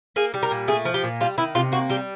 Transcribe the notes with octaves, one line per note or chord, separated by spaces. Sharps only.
A#3 G#4
G3
A#4
A#2
A3 G#4
F3
G4
A#2
G3 F4
D#3 E4
C3 F4
A#3 F#4
G3 G4